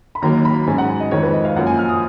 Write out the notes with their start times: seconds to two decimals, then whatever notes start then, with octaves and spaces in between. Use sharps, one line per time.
0.15 B5
0.22 D#2 D#3 F#3 A#3 A#5
0.45 B5
0.67 G#2 F#3 C#4 G#5
0.78 F#5
1.00 D#5
1.11 F2 D#3 G#3 C#5
1.23 B4
1.33 D#5
1.45 F5
1.56 F#2 F3 A#3 F#5
1.67 G#5
1.79 F6
1.89 D#6